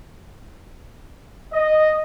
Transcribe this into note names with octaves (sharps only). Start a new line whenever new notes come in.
D#5